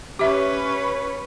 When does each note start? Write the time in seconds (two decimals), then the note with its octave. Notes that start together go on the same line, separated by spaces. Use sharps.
0.19 C#4 G4 B4 C#5 E5